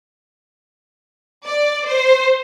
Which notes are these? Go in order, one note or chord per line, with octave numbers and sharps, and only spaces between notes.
D5
C5